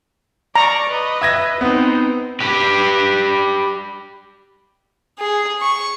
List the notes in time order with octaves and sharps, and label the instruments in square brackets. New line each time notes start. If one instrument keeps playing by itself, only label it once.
[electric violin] D5 C#6 [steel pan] A#5
[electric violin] B4 D#5
[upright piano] E5 G#6 A#6
[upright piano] B3 [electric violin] C4 D#4
[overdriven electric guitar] G4 B4
[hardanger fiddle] G#4
C#6